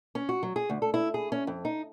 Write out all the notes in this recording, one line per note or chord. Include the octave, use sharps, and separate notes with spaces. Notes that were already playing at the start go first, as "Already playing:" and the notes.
C#4
F#4
F#3
G#4
D2
A4
E4
G#4
C#4
F2
D#4